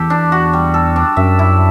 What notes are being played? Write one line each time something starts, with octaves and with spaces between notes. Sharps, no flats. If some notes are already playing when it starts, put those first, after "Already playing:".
Already playing: E2 G4 A4
D4
F#4
G3
A4
D4
F#2 E5
E4